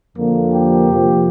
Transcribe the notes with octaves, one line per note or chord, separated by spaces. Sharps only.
F2 D3 F3 A#3
G4
F2 C3 F3 A#3